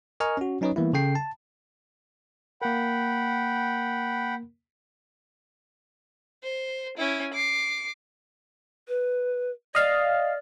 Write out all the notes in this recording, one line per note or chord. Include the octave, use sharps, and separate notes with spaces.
A#4 D#5 G#5 C#6 F6
C#4 F#4
F#3 C#4 D#4 B4 C#5 D#5
E3 G3 A#3 B3 E4
C#3 A4 G5 C7
A5
A#3 A#4 F#5 G5 B5
C5
C#4 E4
D6 C7
B4
D5 D#5 F5